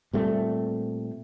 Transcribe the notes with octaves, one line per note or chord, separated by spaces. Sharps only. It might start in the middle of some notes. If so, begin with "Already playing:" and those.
A#2 G3 A3 C4